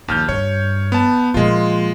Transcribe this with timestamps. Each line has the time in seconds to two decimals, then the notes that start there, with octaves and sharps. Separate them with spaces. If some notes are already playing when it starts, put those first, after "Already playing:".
0.08 A#1 D#2 F6 G6
0.29 G2 C#5
0.92 B3 A5
1.34 A#2 F3 G#3 F4